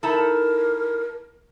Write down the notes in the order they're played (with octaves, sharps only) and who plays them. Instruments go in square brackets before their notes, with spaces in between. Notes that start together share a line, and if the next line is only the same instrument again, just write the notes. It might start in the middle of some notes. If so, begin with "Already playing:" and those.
[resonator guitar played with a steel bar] D#4 E4 A4 [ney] A#4